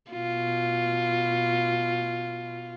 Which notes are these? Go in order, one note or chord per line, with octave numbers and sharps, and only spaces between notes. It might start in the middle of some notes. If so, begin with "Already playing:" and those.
B2 F4